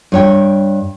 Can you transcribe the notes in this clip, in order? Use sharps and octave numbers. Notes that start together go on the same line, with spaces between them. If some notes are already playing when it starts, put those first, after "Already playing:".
G2 C#5 G5